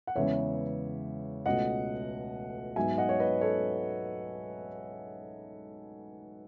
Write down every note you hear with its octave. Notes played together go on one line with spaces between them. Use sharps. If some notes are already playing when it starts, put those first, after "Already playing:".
F#5
E2 C#3 G#3 B3 C#5 E5
C#2 B2 A3 D#5 F#5
G#2 F#3 B3 E5 G#5
D#5 F#5
C#5
B4 D#5
A4 C#5